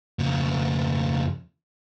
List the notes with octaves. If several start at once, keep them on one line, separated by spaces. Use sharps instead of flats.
F2 C#3